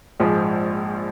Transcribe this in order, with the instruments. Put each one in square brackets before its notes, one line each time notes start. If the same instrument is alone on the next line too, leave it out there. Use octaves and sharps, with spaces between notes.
[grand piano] A#1 G#2 F3 G#3